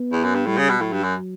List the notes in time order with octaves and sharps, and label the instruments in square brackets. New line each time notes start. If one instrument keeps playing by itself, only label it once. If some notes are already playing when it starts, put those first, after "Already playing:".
Already playing: [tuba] B3
[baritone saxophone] E2
F#2
G2
[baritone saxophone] A2 [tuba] G3
[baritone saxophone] C#3
B2
[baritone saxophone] A2 [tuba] F#3
[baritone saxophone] G2
F#2